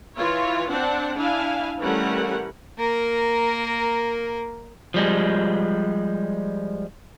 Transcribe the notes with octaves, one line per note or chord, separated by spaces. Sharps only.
E3 F4 C#5
C4 D4 F#5
D4 E4 F5 G#5
E3 G3 A3 C#4 A#4 F#5
A#3 A#4
F3 G3 G#3